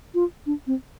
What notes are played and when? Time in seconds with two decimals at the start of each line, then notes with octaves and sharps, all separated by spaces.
0.14 F4
0.46 D4
0.67 C4